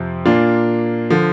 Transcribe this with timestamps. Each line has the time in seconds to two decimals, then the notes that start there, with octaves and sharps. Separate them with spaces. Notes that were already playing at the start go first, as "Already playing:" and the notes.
Already playing: F2 C3 F3 C4
0.26 A#2 A#3 D4 F4
1.10 D3 F3